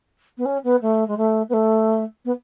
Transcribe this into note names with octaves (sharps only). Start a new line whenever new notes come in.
B3
C#4
B3
A3
G#3
A3
B3
A3
B3